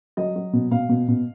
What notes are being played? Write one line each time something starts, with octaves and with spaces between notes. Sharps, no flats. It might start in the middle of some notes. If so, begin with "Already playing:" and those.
F#3 D#5
F#3
B2
B2 F5
B2
B2